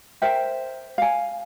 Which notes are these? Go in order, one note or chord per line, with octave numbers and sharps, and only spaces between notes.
A#4 C5 E5 G5
F5 G#5